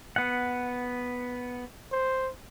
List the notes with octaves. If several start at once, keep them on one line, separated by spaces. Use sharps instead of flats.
B3 F#5
C5